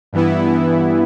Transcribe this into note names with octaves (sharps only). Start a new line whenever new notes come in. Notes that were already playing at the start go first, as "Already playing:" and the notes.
G2 E3 B3 E4